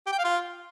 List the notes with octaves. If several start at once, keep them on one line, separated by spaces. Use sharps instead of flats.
G4
G5
F5
F4